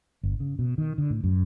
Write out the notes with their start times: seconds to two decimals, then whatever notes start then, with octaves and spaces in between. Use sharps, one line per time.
0.23 G1
0.40 C#3
0.59 B2
0.78 D#3
0.98 D3
1.10 A2
1.24 F#2